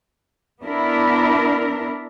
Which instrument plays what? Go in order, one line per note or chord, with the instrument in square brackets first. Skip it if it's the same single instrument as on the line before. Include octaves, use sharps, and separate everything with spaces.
[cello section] B3 D4 E4 A#4